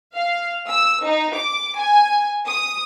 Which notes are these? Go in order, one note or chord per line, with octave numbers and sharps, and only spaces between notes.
F5
E6
D#4
D6
G#5
D#6